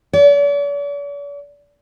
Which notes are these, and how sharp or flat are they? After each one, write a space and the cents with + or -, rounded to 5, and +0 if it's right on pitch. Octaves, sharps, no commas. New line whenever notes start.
D5 -45